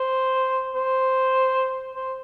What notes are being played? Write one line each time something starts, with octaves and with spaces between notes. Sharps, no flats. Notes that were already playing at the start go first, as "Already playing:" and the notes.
Already playing: C5
C5
C5